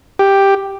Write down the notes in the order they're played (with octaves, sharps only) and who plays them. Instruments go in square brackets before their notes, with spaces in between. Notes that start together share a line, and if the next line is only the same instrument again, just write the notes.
[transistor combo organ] G4